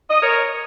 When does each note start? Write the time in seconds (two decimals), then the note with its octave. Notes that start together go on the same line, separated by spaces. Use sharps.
0.10 D#5
0.21 A#4 C#5